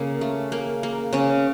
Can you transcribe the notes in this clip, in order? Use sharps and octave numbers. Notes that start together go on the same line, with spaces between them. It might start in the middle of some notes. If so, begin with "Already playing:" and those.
Already playing: C#3 A#3
A3
A#3
A#3
C#3 C#4